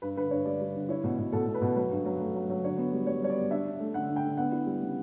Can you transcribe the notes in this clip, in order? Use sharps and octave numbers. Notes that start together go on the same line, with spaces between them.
G2 B4
D3 B4
G2 C#5
G3 D5
G3
D3
E4 C#5
B2
B2
B2 A4
B2
B4
B2
F#3 B4
G2
F#3
A3
F#3
F#3
D3 C#5
B3
G3
G3 C#5
G3 C#5
D5
B3
D4 E5
D4
A3
D3 F#5
D3
G5
D3
B3 F#5
E4
G3
C#3